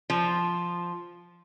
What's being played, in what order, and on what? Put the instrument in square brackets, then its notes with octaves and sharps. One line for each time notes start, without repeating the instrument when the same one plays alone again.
[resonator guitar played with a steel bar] F3